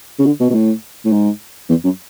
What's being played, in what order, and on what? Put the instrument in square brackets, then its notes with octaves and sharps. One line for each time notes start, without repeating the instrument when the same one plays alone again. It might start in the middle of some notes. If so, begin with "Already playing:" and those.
[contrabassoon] C#3
D3
B2
B2
A2
A2
G#2
E2
F#2